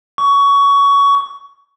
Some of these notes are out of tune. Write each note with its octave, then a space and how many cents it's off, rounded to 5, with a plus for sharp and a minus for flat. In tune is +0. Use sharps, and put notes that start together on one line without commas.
C#6 +20